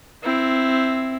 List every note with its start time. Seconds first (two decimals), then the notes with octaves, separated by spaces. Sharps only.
0.23 C4 E4